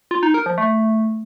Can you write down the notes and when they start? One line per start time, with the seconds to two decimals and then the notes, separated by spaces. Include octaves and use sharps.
0.11 F4
0.23 D#4
0.34 A#4
0.46 F3
0.58 A3